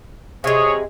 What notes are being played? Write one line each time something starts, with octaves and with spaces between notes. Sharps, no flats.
C3 G#3 G#4 C#5